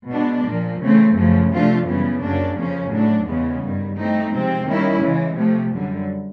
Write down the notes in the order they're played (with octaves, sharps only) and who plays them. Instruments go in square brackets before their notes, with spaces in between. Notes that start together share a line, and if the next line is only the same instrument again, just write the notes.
[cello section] B2 G#3 B3 D4
A#2 F3 A#3
C#3 E3 A3 C4
F#2 C#3 F3 A3
C3 F3 A3 D4 F4
F#2 C#3 E3 G3 B3
F#2 C#3 F#3 A#3 D4
F2 C#3 F3 A#3 C#4
A2 F#3 A3 D4
E2 C#3 E3 G#3 B3
G2 D#3 G3
E3 A3 C4 D#4
C3 F3 G#3 C4
D#3 G3 A#3 C#4 E4
C#3 E3 G#3
C3 F3 A3
F#2 D3 G3